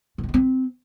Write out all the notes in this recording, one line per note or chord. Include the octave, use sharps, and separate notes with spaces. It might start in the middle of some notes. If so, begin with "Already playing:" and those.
A#2
C3
G#3
C4